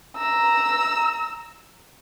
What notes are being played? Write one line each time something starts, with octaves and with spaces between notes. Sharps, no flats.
A#5 E6